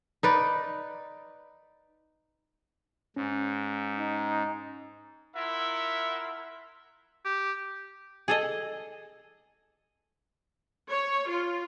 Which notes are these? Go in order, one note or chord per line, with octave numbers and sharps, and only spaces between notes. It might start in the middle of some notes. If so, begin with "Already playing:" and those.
D#4 B4 D5
G#2 C#4
D#4
E4 F4 A#4 E5 F#5
G4
G#4 A4 D#5
C#5
F4